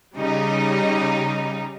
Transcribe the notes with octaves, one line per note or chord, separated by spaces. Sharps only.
C#3 G3 D#4